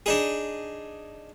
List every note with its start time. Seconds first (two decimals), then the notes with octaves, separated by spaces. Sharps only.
0.06 D4 D#4 G#4